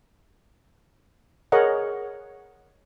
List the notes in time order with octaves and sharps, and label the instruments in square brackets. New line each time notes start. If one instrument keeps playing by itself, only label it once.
[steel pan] G#4 A#4 C#5 D#5 F#5